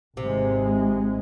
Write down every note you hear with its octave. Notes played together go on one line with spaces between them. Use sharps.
G#1 C3 G#3